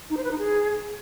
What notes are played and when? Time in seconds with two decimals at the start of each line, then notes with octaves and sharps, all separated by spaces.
0.10 D#4
0.17 C5
0.24 B4
0.31 D#4
0.38 G#4